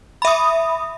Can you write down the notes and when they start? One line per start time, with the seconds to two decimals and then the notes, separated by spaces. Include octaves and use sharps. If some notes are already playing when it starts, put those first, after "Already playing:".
0.22 B5
0.25 E5
0.27 D#6